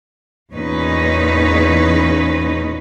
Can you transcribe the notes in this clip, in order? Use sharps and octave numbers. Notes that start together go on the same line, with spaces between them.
E2 A#2 C#4 D#4 B4